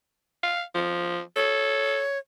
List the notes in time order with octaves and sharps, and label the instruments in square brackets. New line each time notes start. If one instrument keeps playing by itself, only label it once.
[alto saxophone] F5
F3
[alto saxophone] A4 [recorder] C#5